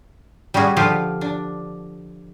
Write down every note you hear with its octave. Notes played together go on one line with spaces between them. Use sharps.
G3 C#4 F#4 G#4
D3 F3 F4 G4 F5
D4